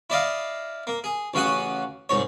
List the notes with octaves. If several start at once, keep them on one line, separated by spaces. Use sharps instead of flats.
E4 D5 D#5 F5
A#3
G#4
A1 C#3 F#4 F#5 D#6
C2 G#2 C#5